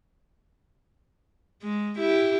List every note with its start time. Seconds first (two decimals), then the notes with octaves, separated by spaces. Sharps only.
1.63 G#3
1.99 E4 G4